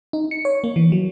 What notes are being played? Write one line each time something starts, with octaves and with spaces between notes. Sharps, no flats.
D#4
C#7
C#5
A#3
E3
F#3